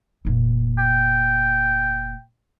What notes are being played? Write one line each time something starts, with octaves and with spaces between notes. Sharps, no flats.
F1 A#2
G5